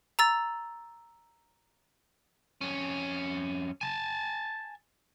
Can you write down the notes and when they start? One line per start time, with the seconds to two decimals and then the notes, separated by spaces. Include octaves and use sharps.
0.19 A#5 E6 A6
2.61 F2 C#4
3.81 G#5 A5